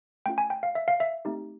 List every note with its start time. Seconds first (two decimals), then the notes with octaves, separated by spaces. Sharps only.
0.26 A3 C#4 F4 G5
0.38 G#5
0.50 G5
0.63 F5
0.75 E5
0.88 F5
1.00 E5
1.25 A3 C4 D#4 G4